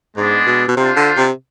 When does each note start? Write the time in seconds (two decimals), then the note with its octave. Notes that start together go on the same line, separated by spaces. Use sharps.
0.16 G#2 G#3 B3 D4
0.46 B2
0.68 B2
0.76 C3 D4 F4 C5
0.97 D3
1.17 C3